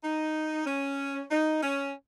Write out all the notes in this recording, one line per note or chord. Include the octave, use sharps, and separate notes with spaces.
D#4
C#4
D#4
C#4